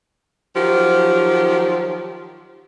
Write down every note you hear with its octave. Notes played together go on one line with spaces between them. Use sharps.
D#3 F3 F#3 G4